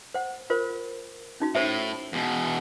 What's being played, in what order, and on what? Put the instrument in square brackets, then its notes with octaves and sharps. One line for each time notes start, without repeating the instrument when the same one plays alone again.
[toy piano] C5 F#5
F4 A#4 C5
C#4 D#4 F#4
[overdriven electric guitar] A2 [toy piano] C5 E5
[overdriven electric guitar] E2 B2